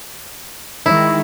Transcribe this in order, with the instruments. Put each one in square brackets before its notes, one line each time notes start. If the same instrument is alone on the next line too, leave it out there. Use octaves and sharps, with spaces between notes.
[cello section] D#3 G#3 [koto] E4